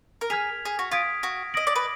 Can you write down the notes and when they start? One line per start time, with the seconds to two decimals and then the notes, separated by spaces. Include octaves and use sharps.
0.21 A#4
0.30 G#4 F6 G#6 B6 F7
0.65 G#4
0.79 F#4
0.91 F4 D#6 G#6 B6 D7
1.23 F#4
1.54 D#5 D#6 A#6 D7 F#7
1.67 D5
1.76 B4